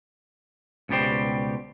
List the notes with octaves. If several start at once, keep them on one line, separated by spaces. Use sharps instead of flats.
C#2 B2 G3 G4 C5